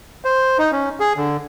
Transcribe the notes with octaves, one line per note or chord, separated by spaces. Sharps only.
C5
D#4
C#4
G#4
D3